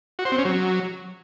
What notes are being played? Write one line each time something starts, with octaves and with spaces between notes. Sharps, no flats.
F#4
C5
C4
C#4
F#3